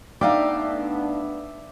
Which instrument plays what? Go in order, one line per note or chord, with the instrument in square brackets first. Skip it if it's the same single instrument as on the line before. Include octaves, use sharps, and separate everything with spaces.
[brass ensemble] A3 B3 D4 [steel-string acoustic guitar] D#4 F5 G5 [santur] D5 E5